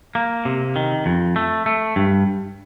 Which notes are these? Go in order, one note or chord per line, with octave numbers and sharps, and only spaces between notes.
A#3
C3
D#3
F2
A3
A3
G2